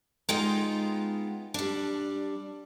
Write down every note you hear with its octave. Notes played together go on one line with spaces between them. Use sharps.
G#3 B3 D#4 F4 G5
G3 D4